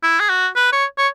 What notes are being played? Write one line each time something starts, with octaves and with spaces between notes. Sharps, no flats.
E4
G#4
F#4
B4
C#5
C#5